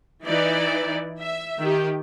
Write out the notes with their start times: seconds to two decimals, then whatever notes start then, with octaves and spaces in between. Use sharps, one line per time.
0.25 E3 D#4 E4 D5
1.20 E5
1.61 D#3 G4